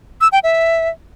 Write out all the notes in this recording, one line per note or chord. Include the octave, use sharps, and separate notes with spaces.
E6
G5
E5